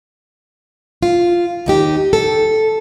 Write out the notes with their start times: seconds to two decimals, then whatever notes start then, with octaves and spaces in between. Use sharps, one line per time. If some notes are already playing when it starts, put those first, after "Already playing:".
1.03 F4
1.66 D#2 D#4 G4
2.13 A4